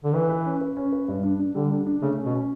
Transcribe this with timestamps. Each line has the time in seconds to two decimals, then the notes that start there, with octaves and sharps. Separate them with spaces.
0.04 D3
0.14 E3 B4
0.29 B4
0.45 C#4
0.61 B4
0.77 C#4
0.92 B4
1.08 G2
1.23 D4
1.40 D4
1.55 D3 G3
1.71 D4
1.87 D4
2.02 C#3 A3
2.18 C#4
2.26 B2
2.34 C#4